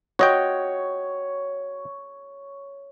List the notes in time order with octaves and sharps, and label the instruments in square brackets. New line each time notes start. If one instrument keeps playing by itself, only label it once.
[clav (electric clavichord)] F#4 D#5 G5 [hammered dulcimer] C#5